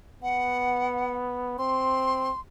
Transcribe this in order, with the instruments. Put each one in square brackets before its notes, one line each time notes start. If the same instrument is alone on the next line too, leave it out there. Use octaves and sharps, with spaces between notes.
[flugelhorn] B3 [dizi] F#5
[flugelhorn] C4 [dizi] C6